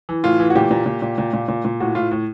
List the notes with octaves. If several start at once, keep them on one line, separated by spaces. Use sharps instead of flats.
E3
A2 F4
E3
F#4
A#2 G4
A#2
A#2
A#2
A#2
A#2
A#2
A#2
A2 F#4
A2 F4
A2